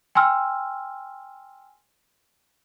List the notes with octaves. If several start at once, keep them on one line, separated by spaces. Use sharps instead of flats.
G5 G#5 C6 E6 F6